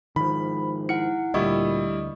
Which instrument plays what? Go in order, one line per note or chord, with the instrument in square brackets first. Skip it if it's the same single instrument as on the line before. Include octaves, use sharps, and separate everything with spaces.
[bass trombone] G#2 [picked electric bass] D#3 F3 [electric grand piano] B5
[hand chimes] E4 F#5 [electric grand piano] C#7
[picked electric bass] D2 [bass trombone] A#2 [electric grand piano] G3 E4 [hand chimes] D#5 C#6 D#6